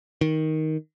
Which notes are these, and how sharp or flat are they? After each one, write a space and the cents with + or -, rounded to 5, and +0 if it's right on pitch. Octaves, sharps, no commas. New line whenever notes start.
D#3 +10